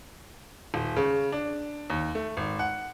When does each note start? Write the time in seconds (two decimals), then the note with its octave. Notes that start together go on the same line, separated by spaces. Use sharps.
0.74 D#1
0.97 C#3
1.32 D4
1.90 D#2
2.15 A3
2.37 G#1
2.59 F#5